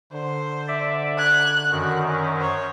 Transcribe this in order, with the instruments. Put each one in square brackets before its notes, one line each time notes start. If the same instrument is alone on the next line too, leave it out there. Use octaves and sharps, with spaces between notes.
[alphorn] D3 [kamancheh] C5
[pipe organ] D5 E5
[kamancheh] F#6 [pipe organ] G#6
[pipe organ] F#2 D#3 [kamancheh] F#4
[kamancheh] C#4
C5 C#5